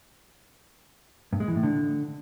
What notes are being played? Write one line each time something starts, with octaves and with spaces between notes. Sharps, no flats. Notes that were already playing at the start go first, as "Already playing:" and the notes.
G2
G#3
E3
A2
D3